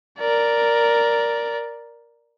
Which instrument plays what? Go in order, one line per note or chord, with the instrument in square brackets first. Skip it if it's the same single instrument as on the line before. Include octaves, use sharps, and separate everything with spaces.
[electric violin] A#4 D5